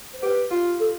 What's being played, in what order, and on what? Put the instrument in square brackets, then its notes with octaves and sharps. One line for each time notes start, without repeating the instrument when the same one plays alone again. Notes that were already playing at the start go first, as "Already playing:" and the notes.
[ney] C5
[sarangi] G4 [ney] B4
[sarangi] F4
[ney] A4